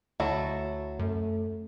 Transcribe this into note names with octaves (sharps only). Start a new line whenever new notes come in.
D2 F#3 E4 A4
F#2 A3